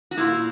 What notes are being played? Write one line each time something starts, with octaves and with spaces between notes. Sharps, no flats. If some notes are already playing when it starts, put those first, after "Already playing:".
F#4
A#2 A#3 E4